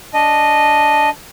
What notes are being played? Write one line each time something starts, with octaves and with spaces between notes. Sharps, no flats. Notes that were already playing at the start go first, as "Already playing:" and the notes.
D4 D#5